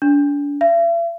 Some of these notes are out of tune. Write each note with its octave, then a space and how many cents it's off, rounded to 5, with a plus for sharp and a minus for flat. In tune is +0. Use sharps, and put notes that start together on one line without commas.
D4 -35
E5 +45